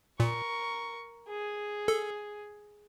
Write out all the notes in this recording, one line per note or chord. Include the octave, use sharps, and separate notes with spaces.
A#2 A#4 C#6
G#4
A4